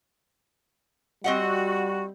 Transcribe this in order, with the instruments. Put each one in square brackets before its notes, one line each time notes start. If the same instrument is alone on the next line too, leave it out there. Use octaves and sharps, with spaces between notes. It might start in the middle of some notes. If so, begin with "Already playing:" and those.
[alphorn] G3 [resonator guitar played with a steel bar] C4 D#5 F#5 [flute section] F#4